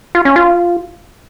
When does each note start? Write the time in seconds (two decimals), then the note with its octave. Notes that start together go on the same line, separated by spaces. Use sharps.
0.15 F4
0.25 C#4
0.36 F4